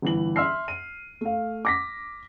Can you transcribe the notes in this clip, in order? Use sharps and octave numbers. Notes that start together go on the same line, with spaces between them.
G1 E3 F#7
E5 C6 E6 F6 C7
D#7
A3 F5
D6 A#6 B6